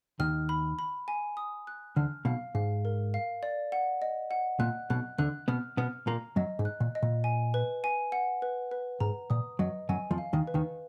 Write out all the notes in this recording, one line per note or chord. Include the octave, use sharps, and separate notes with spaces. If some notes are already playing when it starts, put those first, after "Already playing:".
D#2 D#3 F6
B5
B5
G#5
D#6
F#6
D2 D3 F6
B1 B2 F5
G#2 F5
A#4
F5
D5
F#5
D#5
F#5
A#2 F#6
B1 B2 F#6
D2 D3 F#6
B2 B3 F6
B2 B3 F6
A#2 A#3 A#5
F#2 F#3 D#5
G#2
F#6
A#2
D#5
A#2
G#5
B4
G#5
F#5
B4
B4
G#2 A#5
A#2 D#6
F#2 F#3 D#5
F#2 F#3 G#5
F2 F3
F5
D#2 D#3
B4
D#2 D#3